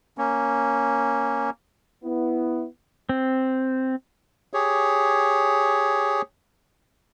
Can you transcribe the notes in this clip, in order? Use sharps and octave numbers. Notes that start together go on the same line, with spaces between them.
A#3 C#4
B3 E4
C4
G4 G#4 C#5